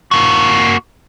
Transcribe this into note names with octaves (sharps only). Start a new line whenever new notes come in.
A#3 F#4